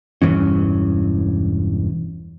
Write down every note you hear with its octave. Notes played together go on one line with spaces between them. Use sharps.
E1 G2 E3 C#4